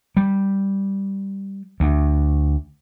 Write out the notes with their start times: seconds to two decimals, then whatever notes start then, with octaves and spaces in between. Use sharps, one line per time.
0.17 G3
1.80 D2